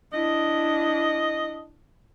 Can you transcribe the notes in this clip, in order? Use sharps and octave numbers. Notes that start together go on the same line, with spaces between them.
D4 E4 D#5